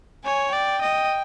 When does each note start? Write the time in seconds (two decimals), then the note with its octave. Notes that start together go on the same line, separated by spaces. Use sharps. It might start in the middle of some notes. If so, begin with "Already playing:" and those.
0.25 C#5 G#5
0.53 D5 G5
0.81 D#5